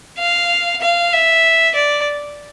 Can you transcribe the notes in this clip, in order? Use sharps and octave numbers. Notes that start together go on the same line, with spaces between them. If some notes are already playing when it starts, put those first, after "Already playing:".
F5
F5
E5
D5